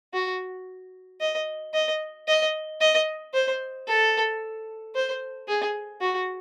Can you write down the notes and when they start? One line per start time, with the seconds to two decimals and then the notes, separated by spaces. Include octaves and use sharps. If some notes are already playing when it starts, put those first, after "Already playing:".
0.14 F#4
1.21 D#5
1.74 D#5
2.28 D#5
2.81 D#5
3.34 C5
3.87 A4
4.95 C5
5.48 G#4
6.01 F#4